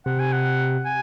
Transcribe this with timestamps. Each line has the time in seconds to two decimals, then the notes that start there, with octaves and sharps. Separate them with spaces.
0.06 C3 F#5
0.19 G#5
0.32 F#5
0.85 G#5